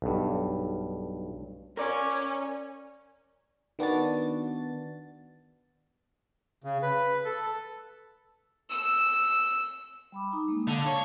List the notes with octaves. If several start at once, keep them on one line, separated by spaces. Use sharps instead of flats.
B1 G2
C#4 A#4 D5
D#3 B3 D4 F#4 A6
C#3
B4
A4
E6
G3 B5 D6
D#4 A#5
G#3 A#3
D3 F5 A5
C#5